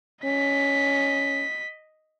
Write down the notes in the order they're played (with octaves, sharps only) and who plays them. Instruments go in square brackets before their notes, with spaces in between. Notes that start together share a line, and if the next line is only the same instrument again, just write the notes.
[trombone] C#4 [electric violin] D#5 B6